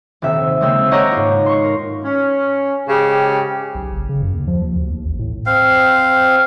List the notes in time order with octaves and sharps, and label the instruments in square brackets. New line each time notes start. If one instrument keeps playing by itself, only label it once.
[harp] D#1 C3 E5
C#3 G#3 A#3 C4 E6
C#5 D#5 F#5 A#5 D6 G6
G#2 F4
C6 C#6
A#4
[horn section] C#4
G#2 C#3 G4
[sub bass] B1
F#1
C#3
F#2
D#2
F3
D#2
D2
D#2
A1
A2
[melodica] C4 F5